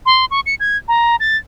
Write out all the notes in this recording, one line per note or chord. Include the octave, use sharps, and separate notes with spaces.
C6
C#6
C#7
G#6
A#5
A6